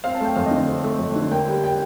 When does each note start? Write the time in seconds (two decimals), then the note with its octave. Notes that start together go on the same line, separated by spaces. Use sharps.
0.04 C4 F5
0.15 A5
0.20 A3 G5
0.36 F2 F5
0.46 D#5
0.51 D3
0.68 C4
0.84 A3
0.99 F2
1.16 D3
1.31 A#3 G5
1.48 G3
1.64 G5